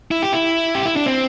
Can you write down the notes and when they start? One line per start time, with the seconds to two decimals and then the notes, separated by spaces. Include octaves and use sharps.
0.11 E4
0.23 G4
0.33 E4
0.75 G4
0.86 E4
0.96 D4
1.06 C4